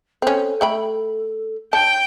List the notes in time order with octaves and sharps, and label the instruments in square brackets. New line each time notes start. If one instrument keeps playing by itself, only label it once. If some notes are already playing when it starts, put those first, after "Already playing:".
[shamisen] C4 C#4 [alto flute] A4
[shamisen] A3 G5 B5
[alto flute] C#5 [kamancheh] G5 [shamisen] A5